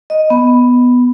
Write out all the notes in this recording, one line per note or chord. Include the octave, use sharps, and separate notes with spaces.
D#5
B3